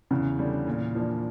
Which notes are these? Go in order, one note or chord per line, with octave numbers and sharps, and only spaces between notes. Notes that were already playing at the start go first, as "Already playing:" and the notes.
E2 C#3 E3
D3 G3 C#4
A#2
F3 A#3 D4